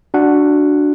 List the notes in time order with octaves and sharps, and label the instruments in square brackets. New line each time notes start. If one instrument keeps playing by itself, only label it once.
[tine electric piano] D4 F#4 F#5